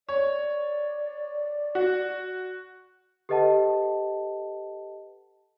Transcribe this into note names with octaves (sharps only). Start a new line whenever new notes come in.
C#5 D5
F#4
G4 A4 B4 D#5 F#5 A5